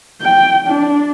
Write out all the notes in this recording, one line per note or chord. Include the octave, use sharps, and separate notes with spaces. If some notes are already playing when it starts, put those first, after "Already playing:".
G5
D4